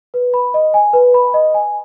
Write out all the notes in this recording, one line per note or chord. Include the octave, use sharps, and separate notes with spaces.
B4
B5
D#5
G#5
B4
B5
D#5
G#5